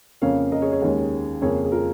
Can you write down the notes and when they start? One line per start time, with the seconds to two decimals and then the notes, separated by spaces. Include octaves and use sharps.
0.22 F2 C#3 A#3 C#4 C#5 F5
0.52 A#4 D#5
0.62 G#4 C#5
0.72 G#4 C#5
0.82 D#2 D#3 G#3 C#4
1.42 F2 C#3 A#3 G#4 C#5
1.65 G#4
1.71 F4 A#4